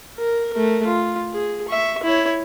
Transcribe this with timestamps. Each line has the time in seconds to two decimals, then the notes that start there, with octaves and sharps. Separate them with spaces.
0.19 A#4
0.53 A3 A#4
0.87 F4
1.33 G#4
1.68 E5 C#6
2.03 E4 C#5